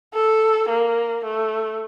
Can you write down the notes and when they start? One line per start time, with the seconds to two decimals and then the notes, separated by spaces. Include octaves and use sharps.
0.14 A4
0.69 A#3
1.25 A3